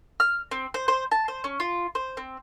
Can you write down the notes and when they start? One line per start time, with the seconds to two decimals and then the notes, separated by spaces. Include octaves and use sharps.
0.20 F6
0.51 C4
0.74 C5
0.88 C5
1.12 A5
1.28 C5
1.44 C#4
1.60 F4
1.95 C5
2.17 C4